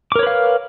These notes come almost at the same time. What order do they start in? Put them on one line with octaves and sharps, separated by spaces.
D6 A#4 C#5 B4 F5